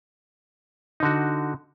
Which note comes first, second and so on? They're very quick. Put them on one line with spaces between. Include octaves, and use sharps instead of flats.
D#4 D3 F#4